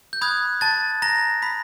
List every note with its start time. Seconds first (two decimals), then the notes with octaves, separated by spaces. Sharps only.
0.13 G6
0.21 B5 D#6 F#6 G#6
0.61 A5 A6
1.02 A#5 A#6
1.42 B5 B6